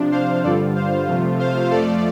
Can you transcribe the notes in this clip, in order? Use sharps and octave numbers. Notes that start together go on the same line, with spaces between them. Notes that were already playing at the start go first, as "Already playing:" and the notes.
Already playing: C3 F3 D4
C5 F5
G2 D3 G3 F4 A4 D5
C5 F5
C3 F3 A3 F4
C5 F5
F2 F3 A3 F4 A4 D5